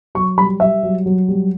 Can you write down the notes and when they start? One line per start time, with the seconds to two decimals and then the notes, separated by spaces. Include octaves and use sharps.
0.15 F#3 C#6
0.38 G3 B5
0.60 G3 E5
0.83 F#3
1.06 F#3
1.28 G3